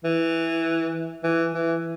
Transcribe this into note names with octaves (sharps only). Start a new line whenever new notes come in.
E3
E3
E3